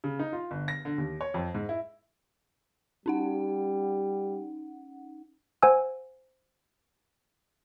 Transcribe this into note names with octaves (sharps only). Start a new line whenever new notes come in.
C#3
D#4
F4
G1
A#6
D3
D#2
C#5
F2
G#2
E4
G3 C#4 D#4 F#5
C5 F#5 G#5 E6